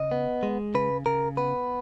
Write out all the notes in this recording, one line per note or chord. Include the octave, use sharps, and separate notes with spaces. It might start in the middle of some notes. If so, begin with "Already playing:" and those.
Already playing: C#3 D#5
B3
G#3
C#3 B4
C#3 A#4
B3 B4